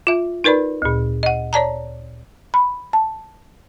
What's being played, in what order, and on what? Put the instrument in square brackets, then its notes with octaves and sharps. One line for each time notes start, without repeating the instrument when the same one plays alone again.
[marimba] F4 E5
D#4 A#4 B4 D5 B5
D2 A#2
D#5 F#5
C#5 D5 A5 A#5
B5
A5